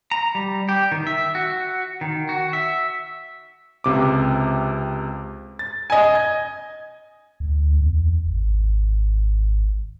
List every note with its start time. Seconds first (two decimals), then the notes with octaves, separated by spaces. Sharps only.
0.11 A#5
0.35 G3
0.69 G4
0.92 D#3
1.07 E5
1.35 F#4
2.01 D#3
2.29 F#4
2.53 E5
3.84 C#2 C3 D6
5.59 A6
5.90 D#5 G#5
6.15 G#6
7.40 D2
7.80 E2
8.27 G#1